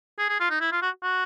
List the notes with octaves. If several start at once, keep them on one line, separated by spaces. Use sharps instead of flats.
G#4
G#4
F4
D#4
E4
F4
F#4
F#4